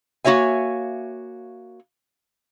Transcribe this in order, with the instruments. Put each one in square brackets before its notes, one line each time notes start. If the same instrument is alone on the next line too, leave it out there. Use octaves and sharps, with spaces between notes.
[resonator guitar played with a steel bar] A#3 F#4 C#5 E5 G#5